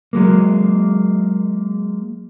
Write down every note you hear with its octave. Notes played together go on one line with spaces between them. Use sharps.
F#3 G#3 A#3